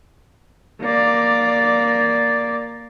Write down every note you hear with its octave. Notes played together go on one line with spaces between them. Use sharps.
A#3 D5